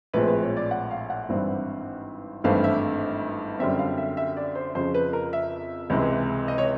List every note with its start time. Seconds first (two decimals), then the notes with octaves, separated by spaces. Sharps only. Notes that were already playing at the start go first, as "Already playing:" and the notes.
0.14 A#1 A2 F3 G#3 C4 B4
0.28 B4
0.43 C#5
0.57 D5
0.71 F#5
0.91 F5
1.10 F#5
1.29 G#1 G2 E3 G3 C4
2.44 G#1 G2 E3 A3 C4 F5
2.64 E5
3.59 F#2 D3 G3 C4 E5
3.79 F5
3.98 E5
4.17 E5
4.37 D5
4.55 C5
4.75 F2 C#3 F3 C5
4.94 B4
5.13 A#4
5.33 E5
5.90 C#2 C3 E3 G#3
6.48 D#5
6.58 C#5